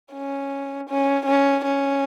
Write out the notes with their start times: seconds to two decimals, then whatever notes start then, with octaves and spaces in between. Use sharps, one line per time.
0.13 C#4
0.89 C#4
1.26 C#4
1.65 C#4